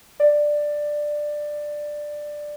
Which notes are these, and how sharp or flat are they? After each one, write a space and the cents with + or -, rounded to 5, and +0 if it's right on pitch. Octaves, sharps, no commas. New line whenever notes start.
D5 +10